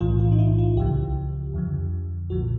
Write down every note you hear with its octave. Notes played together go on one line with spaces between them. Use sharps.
B1 A2 E3 F4
F4
D#4
E4
F4
C#2 C#3 F3 G4
F2 D3 F3
B1 A#2 F3 F#4